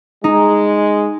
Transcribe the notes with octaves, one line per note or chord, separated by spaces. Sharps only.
G#3 D#4